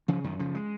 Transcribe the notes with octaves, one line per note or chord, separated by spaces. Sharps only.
C#3 F3
F#2 D#3
C#3 F3
G#3